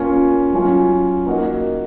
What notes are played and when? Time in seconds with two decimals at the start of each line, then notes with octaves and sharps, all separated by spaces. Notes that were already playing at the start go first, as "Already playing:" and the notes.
Already playing: A#3 C#4 F4
0.53 F#3 C#4 F4
1.26 A#3 D#4 F#4